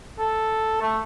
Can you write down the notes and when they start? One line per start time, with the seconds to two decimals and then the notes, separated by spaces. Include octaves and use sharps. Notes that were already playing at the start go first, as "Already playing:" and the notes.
0.19 A4
0.82 A3